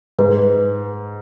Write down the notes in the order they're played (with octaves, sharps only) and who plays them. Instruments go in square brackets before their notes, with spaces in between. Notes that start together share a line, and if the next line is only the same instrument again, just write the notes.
[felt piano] G#2 [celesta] B4